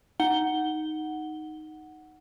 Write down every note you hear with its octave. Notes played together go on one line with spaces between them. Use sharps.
D#4 F#5 G7